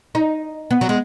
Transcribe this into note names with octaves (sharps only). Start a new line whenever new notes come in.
D#4
B3
F#3
G#3